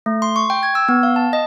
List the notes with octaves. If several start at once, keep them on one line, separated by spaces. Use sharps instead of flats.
A3
C6
C#6
G5
G#6
E6
B3
F5
A5
D#5